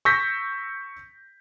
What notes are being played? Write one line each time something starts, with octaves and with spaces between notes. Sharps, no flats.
C#6 E6 G6 A#6 B6